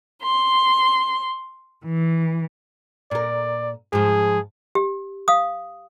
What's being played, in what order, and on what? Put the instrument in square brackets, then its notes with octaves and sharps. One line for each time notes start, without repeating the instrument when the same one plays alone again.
[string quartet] C6
E3
[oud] A#2 A#4 [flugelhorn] D5
[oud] G#2 F3 [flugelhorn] G#4
[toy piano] G4
F5 D#6